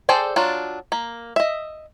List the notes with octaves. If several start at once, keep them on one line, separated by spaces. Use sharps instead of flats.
G#4 A4 C5 D5 G5
F#3 D4 F4
A#3
D#5 E5